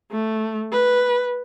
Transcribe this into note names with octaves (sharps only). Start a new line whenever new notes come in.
A3
B4